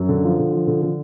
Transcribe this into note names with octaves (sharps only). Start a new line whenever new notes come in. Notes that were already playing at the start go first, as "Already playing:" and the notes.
Already playing: F#2
D3
F3
D3
F3
D3
D3